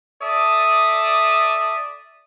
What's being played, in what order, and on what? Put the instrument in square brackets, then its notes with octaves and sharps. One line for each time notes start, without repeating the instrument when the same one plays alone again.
[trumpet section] A4 D5 E5 D#6